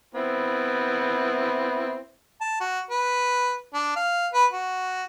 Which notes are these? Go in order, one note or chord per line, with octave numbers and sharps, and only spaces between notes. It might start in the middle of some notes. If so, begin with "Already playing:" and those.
B3 C4 E4
A5
F#4
B4
D4
F5
B4
F#4